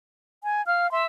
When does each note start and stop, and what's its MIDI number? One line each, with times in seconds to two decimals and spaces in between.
0.44 0.65 80
0.67 0.91 77
0.67 0.87 89
0.92 1.07 76
0.92 1.04 84